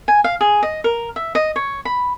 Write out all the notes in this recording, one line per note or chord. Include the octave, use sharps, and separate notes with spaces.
G#5
F5
G#4
D#5
A#4
E5
D#5
C#5
B5